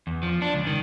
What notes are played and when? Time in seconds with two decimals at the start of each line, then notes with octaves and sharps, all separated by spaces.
0.07 E2
0.23 F3
0.42 D4
0.54 C#2
0.67 D#3